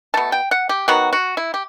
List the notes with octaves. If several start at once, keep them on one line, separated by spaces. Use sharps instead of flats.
B2 A3 A5
G5
F#5
G4
D#3 F#3 B3 F#4
F#4
E4
G4